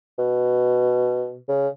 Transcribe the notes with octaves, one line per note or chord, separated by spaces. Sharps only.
B2
C#3